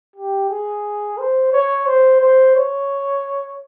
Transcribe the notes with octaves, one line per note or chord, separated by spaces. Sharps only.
G4
G#4
C5
C#5
C5
C5
C#5